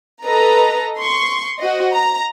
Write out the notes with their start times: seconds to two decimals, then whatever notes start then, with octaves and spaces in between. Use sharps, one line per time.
0.24 A4 B4 D#5 A#5
0.97 C6 C#6
1.58 F#4 C5 D#5
1.91 A#5